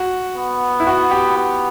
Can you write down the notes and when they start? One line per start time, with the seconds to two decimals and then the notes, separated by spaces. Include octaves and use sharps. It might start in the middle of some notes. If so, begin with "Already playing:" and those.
Already playing: F#4
0.36 B3
0.80 E4
0.87 F#4
1.11 G4
1.37 B3